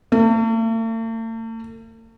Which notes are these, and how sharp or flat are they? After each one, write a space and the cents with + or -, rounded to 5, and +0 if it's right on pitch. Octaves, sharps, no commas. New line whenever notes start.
A3 +45